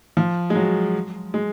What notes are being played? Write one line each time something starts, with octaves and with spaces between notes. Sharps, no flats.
F3
G#3
F#3
G#3